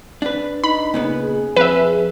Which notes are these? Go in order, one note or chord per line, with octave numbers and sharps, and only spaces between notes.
D4 B4
D#4 B5
A#2 C#3 B3
G#4
F2 B4 E5